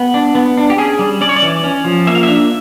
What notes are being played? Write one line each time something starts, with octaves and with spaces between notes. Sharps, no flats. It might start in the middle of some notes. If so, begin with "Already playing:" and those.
Already playing: B3 G4
D4
B3
D4
G4
C#4 G#4
G3
C#4 D5
C#5
D5
E3
C#4
F3
A#3 E5
F5
D4 E5